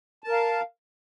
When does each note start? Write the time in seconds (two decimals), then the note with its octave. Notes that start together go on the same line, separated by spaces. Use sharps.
0.24 A5
0.28 A#4
0.32 F5